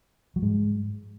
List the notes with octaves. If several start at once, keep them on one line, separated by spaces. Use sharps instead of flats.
F#3
G#2 G#3